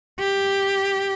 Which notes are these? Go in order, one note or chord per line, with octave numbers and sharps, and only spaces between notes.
G4